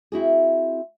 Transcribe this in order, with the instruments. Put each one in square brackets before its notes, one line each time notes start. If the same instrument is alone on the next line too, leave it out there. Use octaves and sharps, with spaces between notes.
[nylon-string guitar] C4 E4 F#4 G#4